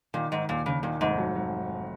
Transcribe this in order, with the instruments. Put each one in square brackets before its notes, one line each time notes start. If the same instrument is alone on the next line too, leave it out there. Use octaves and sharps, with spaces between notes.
[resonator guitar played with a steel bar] A#2 [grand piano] D#3
[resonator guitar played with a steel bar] G#2 [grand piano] D#3
[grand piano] D#2 [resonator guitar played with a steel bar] A#2
[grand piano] D#2 [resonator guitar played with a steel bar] C#3
[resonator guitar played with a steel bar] A#2 [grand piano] D#3
[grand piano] F1 [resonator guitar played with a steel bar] G#2
[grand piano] F#3
F#3